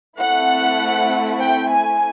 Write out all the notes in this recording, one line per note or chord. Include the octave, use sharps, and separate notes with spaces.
A3 C4 E4 F#5
G5
G#5